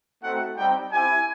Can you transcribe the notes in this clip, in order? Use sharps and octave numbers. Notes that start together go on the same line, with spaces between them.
A3 C4 D#4 F#4 F#5
G3 C4 D#4 G5
C4 E4 G4 G#5